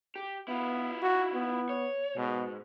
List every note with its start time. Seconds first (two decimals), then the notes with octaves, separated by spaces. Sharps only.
0.16 G4
0.48 B3 E4 F4
1.03 F#4
1.34 B3
1.69 C#5
2.17 G#2 B2